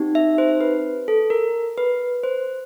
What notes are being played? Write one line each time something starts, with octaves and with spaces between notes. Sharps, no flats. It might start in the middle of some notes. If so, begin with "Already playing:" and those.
Already playing: C4 D#4 G4
E5
C5
B4
A4
A#4
B4
C5